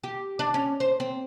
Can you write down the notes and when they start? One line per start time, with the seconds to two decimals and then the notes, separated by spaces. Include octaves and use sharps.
0.04 G4
0.39 D4
0.54 C#4
0.80 C5
1.00 C4